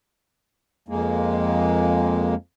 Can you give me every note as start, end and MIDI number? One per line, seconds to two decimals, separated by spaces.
0.88 2.35 41
0.88 2.35 56
0.88 2.35 58